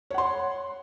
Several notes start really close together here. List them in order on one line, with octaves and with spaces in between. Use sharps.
C#5 F#5 C6